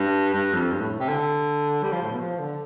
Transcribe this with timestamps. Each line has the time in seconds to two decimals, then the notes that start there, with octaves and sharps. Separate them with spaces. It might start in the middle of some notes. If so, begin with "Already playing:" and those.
Already playing: G2
0.34 G2
0.53 F2
0.72 G2
0.81 A2
1.00 C3
1.09 D3
1.83 G3
1.92 F3
2.02 A2
2.11 B2
2.20 F3
2.39 D3